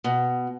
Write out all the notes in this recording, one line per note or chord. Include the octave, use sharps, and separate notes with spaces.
B2